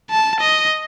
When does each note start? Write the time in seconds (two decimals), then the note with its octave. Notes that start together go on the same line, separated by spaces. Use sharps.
0.11 A5
0.40 D#5